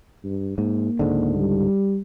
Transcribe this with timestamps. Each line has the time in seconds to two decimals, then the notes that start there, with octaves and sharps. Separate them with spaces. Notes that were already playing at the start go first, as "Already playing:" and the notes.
0.24 G2
0.58 G#2 A#3
0.99 C#2 G#2 D3
1.35 G3